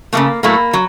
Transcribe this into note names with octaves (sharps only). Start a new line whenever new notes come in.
C#3 F3 A3 A#3
A2 F#3 A3 A#3
F#3